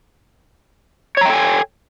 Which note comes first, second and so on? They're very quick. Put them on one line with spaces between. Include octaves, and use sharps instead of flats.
C#5 A#5 G5 A4 G#5